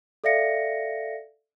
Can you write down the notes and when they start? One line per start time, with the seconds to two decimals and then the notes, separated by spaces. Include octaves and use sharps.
0.24 A4 D5 E5 F5 A#6 C#7